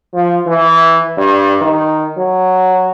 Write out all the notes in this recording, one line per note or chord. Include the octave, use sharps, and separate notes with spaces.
F3
E3
G2
D#3
F#3